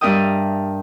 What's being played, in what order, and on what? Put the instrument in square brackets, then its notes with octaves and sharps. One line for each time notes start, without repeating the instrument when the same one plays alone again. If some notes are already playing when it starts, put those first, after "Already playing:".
[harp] G2 D4 A#4 E5 G5 D#6